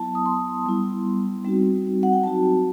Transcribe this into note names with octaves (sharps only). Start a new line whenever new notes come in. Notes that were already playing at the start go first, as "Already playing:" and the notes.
Already playing: F#3 B3 E4 A5
D#6
C6
G3 B3 E4
G3 C4 D#4 F#4
F#5
G5
F#3 C4 D#4 F#4 A5